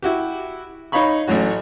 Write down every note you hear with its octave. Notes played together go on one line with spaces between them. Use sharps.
E4 F#4 G4
D#4 C#5 F5 B5 C#6
A1 A2 F#3 C#4 F#4